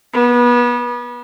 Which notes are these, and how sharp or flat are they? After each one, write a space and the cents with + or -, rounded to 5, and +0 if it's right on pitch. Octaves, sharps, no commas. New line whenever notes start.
B3 -30